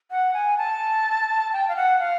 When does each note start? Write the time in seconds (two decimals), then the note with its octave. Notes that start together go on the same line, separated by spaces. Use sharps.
0.11 F#5
0.34 G#5
0.58 A5
1.53 G5
1.68 F5
1.76 F#5
2.00 F5